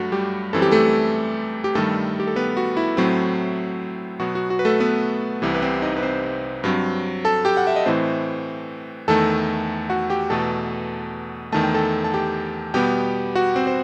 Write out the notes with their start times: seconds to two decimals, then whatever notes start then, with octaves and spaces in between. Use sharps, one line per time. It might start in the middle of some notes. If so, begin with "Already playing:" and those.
Already playing: G2 F#3 A3 F#4
0.12 G3 G4
0.53 F#2 E3 G3 C4 A4
0.62 G4
0.71 A3 A4
1.64 G4
1.75 G2 D#3 G3 A3 A4
2.20 G4
2.27 A4
2.36 B3 B4
2.57 F#4
2.77 E4
2.97 A2 F#3 A3 C4
4.19 B2 F#3 B3 F#4
4.35 F#4
4.50 F#4
4.59 B4
4.65 A3 A4
4.80 B3 B4
5.42 C2 C3 E3
5.54 B4
5.62 C4 C5
5.82 D#4 D#5
5.97 B4
6.03 C4 C5
6.64 G2 F#3 C4
7.25 A4 A5
7.45 G4 G5
7.57 F#5
7.67 E5
7.76 D#5
7.86 A2 E3 A3 C4 C5
9.08 E2 D#3 A3 A4 A5
9.90 F#4 F#5
10.10 G4 G5
10.30 E2 B2 A3 A4 A5
11.52 E2 D#3 A3 A5
11.63 G5
11.74 A4 A5
12.04 A5
12.14 G4 G5
12.74 B2 G3 B3 G4 G5
13.35 F#4 F#5
13.56 C4 C5
13.67 C5